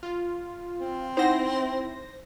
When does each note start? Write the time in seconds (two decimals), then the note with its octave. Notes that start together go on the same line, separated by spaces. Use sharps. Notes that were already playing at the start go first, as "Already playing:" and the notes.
0.03 F4
0.80 C4
1.17 D#4 E4 C5 F#5 A#6